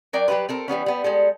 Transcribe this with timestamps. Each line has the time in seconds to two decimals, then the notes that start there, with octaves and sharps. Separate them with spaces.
0.13 F#3 A#4 D5 G5
0.28 F#3 G3 F4 G4 B4
0.49 C4 A4 A#4
0.68 E3 G3 B3 C#4
0.86 G3 B3
1.04 G3 G#3 A4